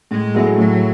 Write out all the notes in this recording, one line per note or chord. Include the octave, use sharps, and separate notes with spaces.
A2 G#3
F#3 A3 E4 G#4
A2 F#3